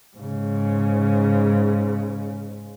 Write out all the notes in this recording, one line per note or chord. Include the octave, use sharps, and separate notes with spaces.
G#2 C#3